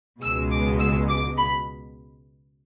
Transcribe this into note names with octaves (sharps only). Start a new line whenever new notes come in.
C#2 B2 G#3 E6
D6
E6
D6
B5